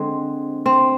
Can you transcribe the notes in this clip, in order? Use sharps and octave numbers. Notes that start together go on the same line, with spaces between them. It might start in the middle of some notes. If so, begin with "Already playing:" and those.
Already playing: D3 G#3 C4
C4